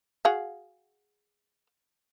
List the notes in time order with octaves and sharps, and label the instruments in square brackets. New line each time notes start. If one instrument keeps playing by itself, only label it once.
[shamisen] F#4 G#4 F5